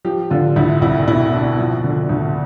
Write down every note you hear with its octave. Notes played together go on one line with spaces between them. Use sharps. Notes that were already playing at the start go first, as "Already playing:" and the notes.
F3 G4
D3 F4
D2 E4
C2 E4
B2 E4
B2 D4
F3
D3
D2